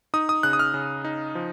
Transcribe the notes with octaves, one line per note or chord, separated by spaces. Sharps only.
D#4 D#6
D#6
C#3 F#6
D#6
F6
C#3
D#4
F3